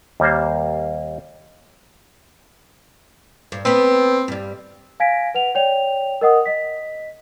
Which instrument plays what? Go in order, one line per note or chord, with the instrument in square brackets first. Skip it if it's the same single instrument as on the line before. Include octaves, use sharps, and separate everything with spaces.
[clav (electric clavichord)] D#2 G3 A#3 C5
[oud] G2
[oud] B3 B4 [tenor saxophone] C4
[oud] G2 G3
[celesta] F5 G#5 G#6 A#6 B6 D7
B4 F#5 F7
C#5 D5 G5 F7
A#4 D#5 F#5 D#6
D#5 B6